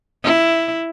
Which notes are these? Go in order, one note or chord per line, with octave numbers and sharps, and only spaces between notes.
E4